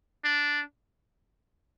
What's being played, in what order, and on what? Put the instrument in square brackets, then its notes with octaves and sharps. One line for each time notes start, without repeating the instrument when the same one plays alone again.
[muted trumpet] D4